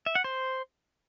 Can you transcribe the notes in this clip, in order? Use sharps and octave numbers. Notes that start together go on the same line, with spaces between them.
E5
F#5
C5